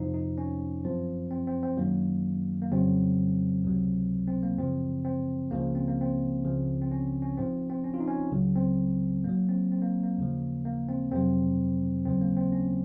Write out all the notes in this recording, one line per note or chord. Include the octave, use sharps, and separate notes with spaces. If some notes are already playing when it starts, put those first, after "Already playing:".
Already playing: F2 C3 F3 D#4
D#4
C#4
F#2 F3 C4
C4
C4
C4
F#2 D#3 F#3 A#3
A#3
F2 C#3 F#3 C4
C#2 C3 F#3
C4
A#3
F#2 C#3 F3 C4
C4
C#2 C#3 F3 A#3
C4
A#3
C4
C#2 C#3 F3
C4
C#4
C#4
G#2 F3 C4
C4
C#4
F4
D#4
C#4
C#2 C#3 F#3
C4
G#2 F#3 A#3
C4
C4
A#3
A#3
D#2 C#3 F3
A#3
C4
F2 C3 F#3 C4
D#2 C#3 F#3 C4
A#3
C4
C#4